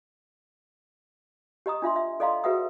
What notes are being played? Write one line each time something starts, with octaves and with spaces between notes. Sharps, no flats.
G4 D#5 A#5 D#6
D4 F4 E5 C6
E5
A4 D5 D#5 F5 A#5 C6
F#4 G#4 B4 E5 F#5 D#6